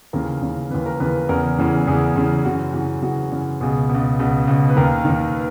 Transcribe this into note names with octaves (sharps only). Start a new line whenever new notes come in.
D#2 C#3 E3 A#4
D#2 C#3 E3
D#2 C#3 E3 B4
A#4
D#2 C#3 E3 B4
E2 C#3 E3 A#4
E2 C#3 E3
E2 C#3 E3 G#4
E2 C#3 E3
F#2 C#3 E3 F#4
F#2 C#3 E3 F#4
F#2 C#3 E3 F#4
F#2 C#3 E3
C#2 B2 G#4
C#2 B2
C#2 B2
C#2 B2
B4
D#2 D#3 A#4
D#3
D#2
B4